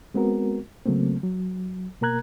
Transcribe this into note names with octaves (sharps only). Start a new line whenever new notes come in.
G#3 B3 C4 F#4 A#4
C#3 F#3 A3 A#3 C4
F#3
B2 A#3 A#4 A#5 F#6 G#6